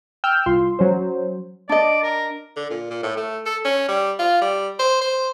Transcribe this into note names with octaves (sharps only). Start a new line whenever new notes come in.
G5 E6 F6 G6
C2 F4 C6
F#3 C#4 C5
D4 D5 D#5
A#4
D3
A#2
A#2
A2
A3
A4
C#4
G3
F4
G3
C5
C5